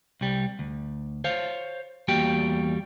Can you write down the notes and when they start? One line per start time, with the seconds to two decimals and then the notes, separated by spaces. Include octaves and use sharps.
0.21 C2 G3
0.59 D2
1.24 C5 C#5 F5
2.08 E2 G3 A#3 F#4 G4 G5